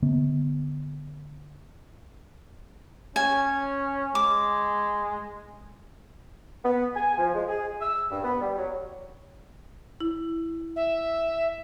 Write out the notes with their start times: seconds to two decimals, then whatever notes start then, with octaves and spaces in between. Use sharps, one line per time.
0.02 D3 B3
3.16 C#4 G#5
4.15 G#3 D6
6.64 B3
6.96 G#5
7.18 F3
7.35 G#3
7.48 G#4
7.82 E6
8.11 G2
8.23 B3
8.42 G3
8.58 F#3
10.00 E4
10.76 E5